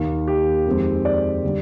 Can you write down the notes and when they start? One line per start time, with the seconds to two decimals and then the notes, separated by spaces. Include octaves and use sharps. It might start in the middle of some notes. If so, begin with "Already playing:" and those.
Already playing: D#2 D#3 A#3
0.27 G4
0.66 F2 D#3 G#3 C4
1.05 D5
1.44 D3 G3